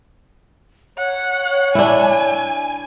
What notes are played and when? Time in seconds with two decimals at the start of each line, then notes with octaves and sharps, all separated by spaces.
0.98 C#5 F#5
1.75 D4 E4 G#5